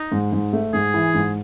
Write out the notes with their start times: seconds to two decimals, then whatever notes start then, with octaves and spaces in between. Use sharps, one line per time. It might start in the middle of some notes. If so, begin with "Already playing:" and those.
Already playing: D#4
0.12 G#2
0.32 G#2
0.53 A3
0.73 G#2 G#4
0.94 E3
1.14 G#2